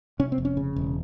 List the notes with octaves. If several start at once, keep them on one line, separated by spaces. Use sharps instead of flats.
C3 C#4
C4
F1
C#4
C#3
E1